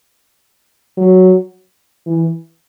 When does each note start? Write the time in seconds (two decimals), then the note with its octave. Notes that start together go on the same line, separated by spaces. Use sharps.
0.97 F#3
2.06 E3